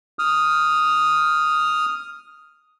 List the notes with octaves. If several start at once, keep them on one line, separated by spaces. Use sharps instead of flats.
D#6 F6